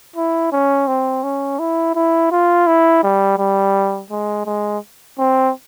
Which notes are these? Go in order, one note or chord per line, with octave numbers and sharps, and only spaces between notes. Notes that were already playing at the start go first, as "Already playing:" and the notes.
E4
C#4
C4
C#4
E4
E4
F4
E4
G3
G3
G#3
G#3
C4